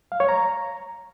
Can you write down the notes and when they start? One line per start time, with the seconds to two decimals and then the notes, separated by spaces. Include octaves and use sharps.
0.12 F5
0.20 C#5
0.29 A#5